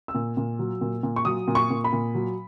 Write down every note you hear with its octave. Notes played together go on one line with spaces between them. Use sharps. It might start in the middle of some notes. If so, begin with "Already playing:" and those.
E6
A#2
A#2
F#3
A#2
A#2
C#6
F#3 D#6
A#2
C#6
A#2
B5
A#2
F#3